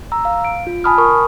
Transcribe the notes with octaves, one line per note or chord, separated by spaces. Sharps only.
A#5 E6
F5
D7
F4
G#5 A5 B5 D#6 F6
A#4 C#6 D#6